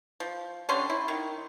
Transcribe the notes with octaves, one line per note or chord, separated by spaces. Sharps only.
F3
D3 G3 C#4 C6
E4
D#3